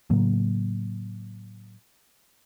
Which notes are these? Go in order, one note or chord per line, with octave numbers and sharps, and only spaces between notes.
A2 C#3 F#3 A#3